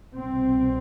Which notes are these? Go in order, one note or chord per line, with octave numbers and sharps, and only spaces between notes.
C2 B2 C4